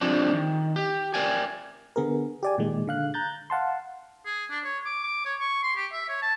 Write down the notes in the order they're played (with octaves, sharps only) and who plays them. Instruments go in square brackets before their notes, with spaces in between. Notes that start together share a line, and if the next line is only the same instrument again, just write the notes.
[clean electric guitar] F3 G3 G#3 C4 D4
D#3
G4
A#4 D5 G5 G#5
[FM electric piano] D3 B3 G#4 A#4
G4 D5 G#5
A#2 D#3 G#3
D3 F5 F#6
A#5 F#6 G6 A6
F5 F#5 A5 C6
[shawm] G#4
D4
C#5
D6
D6
C#5
C#6
C6
G4
E5
C#5
A5